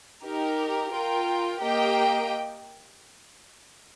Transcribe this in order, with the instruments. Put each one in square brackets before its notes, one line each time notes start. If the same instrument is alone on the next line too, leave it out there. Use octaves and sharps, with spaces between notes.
[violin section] D#4 G4 A#4
F4 A#4 G5
A#3 G4 A#4 D#5 G5